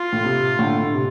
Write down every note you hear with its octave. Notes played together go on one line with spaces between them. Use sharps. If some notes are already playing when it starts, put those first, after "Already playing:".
Already playing: F4
A2
C3
A2 D3
C3